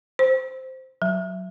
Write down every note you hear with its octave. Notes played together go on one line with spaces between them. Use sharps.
C5
F#3